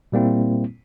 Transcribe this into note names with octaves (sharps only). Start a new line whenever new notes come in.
A#2 G3 A#3 C4 E4